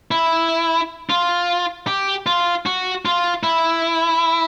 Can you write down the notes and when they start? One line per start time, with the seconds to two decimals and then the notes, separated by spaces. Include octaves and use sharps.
0.11 E4
1.10 F4
1.87 G4
2.26 F4
2.66 F#4
3.05 F4
3.43 E4